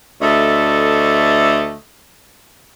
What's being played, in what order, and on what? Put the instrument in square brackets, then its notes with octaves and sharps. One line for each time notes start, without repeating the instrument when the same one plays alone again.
[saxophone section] D2 A3 A4 D#5